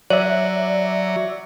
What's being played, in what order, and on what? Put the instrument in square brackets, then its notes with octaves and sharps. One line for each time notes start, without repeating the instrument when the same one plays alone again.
[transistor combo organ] F#3 [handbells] C#5 [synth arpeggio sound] D5 E5